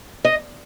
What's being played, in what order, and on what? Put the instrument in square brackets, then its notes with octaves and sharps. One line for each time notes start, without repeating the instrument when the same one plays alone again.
[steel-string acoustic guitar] D#5